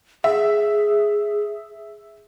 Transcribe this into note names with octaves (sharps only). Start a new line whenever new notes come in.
G#4 E5